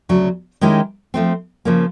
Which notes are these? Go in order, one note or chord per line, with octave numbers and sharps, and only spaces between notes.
D2 C#3 F#3
D#3 G#3 C#4 E4 G4
F3 A3 C4
C#3 F3 A#3